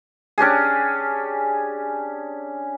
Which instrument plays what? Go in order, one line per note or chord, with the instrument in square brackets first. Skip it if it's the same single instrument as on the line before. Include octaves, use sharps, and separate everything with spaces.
[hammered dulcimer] C#4 D4 G4 G#4